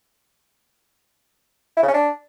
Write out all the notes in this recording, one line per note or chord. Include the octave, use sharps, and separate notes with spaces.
E4
C#3
C#4
D4